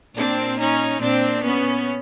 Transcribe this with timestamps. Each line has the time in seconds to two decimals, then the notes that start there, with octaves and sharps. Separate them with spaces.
0.16 A#2 C4 D4
0.59 C#4 D#4
1.01 A#2 C4 D4
1.42 B3 C#4